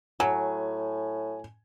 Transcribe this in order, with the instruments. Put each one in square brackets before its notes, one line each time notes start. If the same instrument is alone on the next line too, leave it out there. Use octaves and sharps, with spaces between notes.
[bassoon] A2 [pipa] F#3 [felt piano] G#5